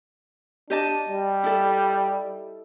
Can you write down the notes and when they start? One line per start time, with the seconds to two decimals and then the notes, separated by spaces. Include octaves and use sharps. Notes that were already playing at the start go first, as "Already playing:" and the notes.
0.70 D4 G4 D#5 A5
1.10 G3
1.44 E4 A4